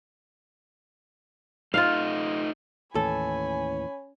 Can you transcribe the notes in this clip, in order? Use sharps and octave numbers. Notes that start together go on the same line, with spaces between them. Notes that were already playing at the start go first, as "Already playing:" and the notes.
A3 D#4 F4 D#5 F5
D#2 A2 E3 C#4 A4 G#5 B5